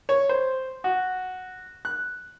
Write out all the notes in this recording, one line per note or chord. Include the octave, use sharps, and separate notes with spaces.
C#5
C5
F#4
F#6